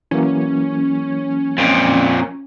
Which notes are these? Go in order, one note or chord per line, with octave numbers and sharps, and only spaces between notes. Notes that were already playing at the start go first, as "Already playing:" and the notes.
E3 F#3 A#3 C#4
F2 A#2